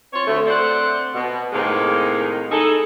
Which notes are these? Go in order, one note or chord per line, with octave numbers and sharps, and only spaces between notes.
C4 F4 C#5
D2 A3
A3 C4 C5 D5 F#5
B2
A2 C3 D#3 G#3 A#3
D#4 E4 G#4 A4